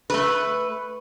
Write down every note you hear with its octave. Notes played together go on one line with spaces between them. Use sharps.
A3 B4